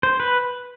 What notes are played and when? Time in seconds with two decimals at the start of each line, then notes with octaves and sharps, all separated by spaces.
0.03 C5
0.20 B4